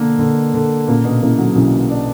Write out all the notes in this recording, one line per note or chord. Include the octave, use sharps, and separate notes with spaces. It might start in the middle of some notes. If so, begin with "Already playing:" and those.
Already playing: B2 D3 A#3
D3
D3
A#2 C#3 A#3
B2 D3
C#3 E3 A#3
D3 F#3
B1 C#3 E3
D4